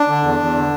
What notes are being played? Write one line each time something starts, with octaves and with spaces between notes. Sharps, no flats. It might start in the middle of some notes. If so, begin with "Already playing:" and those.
Already playing: D4
D3
E2
E2
D3